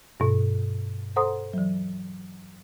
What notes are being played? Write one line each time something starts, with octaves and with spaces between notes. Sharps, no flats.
G2 B2
A4 C5 F#5 A#5 C6 D#6
E3 F#3